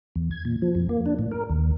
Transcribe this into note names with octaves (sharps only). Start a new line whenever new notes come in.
E2
G#6
A#2
F3
F2
A#3
D4
A2
A#4
D#2